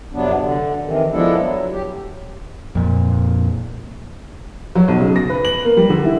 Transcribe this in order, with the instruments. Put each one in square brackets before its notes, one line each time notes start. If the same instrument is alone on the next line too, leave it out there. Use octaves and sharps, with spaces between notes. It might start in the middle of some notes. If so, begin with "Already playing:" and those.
[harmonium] F2 C3 F#3 B3 D4
D3
C3 D#3 E3
F3 G#3 B3 D4 E4 A4
F#3
G4
[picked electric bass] F2 A#2
[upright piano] F#3
B1
C#3
A#6
B4
F#7
A#3
G3
D3
E4